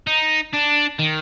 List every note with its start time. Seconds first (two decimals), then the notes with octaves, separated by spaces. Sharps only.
0.07 D#4
0.53 D4
0.99 D#3